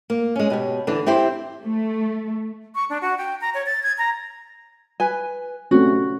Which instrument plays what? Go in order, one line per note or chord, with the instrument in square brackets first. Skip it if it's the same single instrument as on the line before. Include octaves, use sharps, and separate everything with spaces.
[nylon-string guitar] A#3
G#3 C#4
B2 G4 C#5
D3 E3 D4
C4 E4 G4 C5
[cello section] A3
[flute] C#6
D4
F#4
G5
A#5
C#5
A6
G#6
A#5
[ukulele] B4 G#5
[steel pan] A3 C4 C#4 [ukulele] F#4